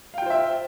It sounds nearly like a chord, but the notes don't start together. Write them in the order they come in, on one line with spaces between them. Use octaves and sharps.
F5 G5 F4 C5 E5